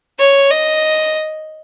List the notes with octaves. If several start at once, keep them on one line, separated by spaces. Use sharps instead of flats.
C#5
D#5